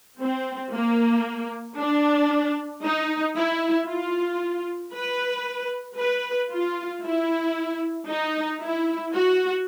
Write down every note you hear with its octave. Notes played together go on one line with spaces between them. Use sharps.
C4
A#3
D4
D#4
E4
F4
B4
B4
F4
E4
D#4
E4
F#4